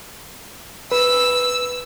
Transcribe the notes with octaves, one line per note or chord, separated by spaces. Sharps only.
B4 E6